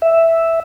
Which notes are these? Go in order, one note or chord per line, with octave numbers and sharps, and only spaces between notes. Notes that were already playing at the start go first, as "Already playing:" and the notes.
E5